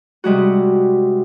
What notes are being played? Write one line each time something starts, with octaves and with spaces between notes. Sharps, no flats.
C3 G3 G#3 F#4